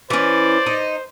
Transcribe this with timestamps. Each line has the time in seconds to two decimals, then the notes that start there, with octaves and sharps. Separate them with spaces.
0.10 E3 C#4 C5 D5
0.66 D#4